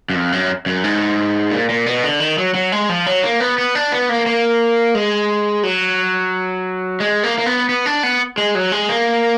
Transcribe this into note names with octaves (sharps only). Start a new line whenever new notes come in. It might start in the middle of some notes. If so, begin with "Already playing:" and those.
F#2
F2
F#2
F#2
G#2
A#2
A#2
B2
D3
D#3
F#3
F#3
G#3
F3
F#3
A#3
B3
B3
D4
B3
A#3
A#3
G#3
F#3
G#3
A#3
A#3
B3
B3
D4
B3
G#3
F#3
G#3
A#3